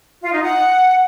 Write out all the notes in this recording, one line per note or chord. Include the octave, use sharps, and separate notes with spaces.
F4
D#4
F#5